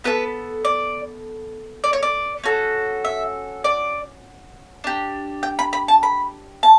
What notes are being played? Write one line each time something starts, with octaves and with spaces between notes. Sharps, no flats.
B3 F#4 A4 B4
D5
D5
C#5
D5
C#4 F#4 A4
E5
D5
D4 G4
G5
B5
B5
A5
B5
A5